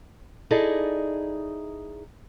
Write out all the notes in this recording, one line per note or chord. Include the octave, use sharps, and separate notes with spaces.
D#4 E4 G#4 A4 D5 D#5